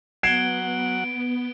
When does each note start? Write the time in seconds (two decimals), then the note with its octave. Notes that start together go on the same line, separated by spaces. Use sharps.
0.23 F#3 B3 F#5 G#6 C7 D7 E7 G7